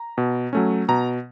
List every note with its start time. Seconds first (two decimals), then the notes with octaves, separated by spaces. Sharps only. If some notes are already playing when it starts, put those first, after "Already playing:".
Already playing: A#5
0.18 B2
0.53 F#3 A3 C#4
0.88 B2 A#5